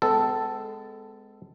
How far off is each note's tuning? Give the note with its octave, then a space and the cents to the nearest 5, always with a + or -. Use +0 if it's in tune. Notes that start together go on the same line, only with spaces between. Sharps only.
G#3 +0 B3 +45 A4 +0